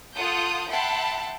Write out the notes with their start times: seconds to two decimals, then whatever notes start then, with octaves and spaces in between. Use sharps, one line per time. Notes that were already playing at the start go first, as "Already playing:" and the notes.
0.17 F4 A4 F#5 D#6 G6
0.71 E5 F#5 G5 A5 B5 C6